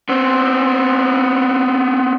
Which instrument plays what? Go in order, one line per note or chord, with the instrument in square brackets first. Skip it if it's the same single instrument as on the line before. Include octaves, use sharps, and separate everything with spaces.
[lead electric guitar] B3 C4